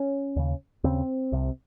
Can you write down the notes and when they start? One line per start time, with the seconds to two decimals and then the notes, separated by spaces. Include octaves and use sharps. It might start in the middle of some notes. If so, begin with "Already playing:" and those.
Already playing: C#4
0.36 D#2 C#3
0.84 D#2 C#3 C4
1.32 C2 C3